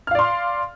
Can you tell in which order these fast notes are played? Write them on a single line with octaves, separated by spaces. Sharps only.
F6 F5 D5 C6